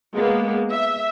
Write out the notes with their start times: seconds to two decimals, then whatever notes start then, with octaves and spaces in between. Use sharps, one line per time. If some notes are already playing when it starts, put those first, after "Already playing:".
0.14 G#3 A#3 B3
0.72 E5